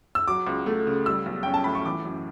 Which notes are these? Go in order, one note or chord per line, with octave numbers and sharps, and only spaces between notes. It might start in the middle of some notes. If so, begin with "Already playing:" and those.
E6
F#3 D6
C#2
A3
C#3
G3 E6
B1
C#4 G5
A5
A2 B5
C#6
E3 D6
F#2